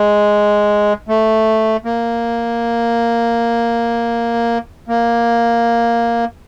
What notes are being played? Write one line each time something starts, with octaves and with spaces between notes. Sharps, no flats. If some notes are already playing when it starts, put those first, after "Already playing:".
Already playing: G#3
A3
A#3
A#3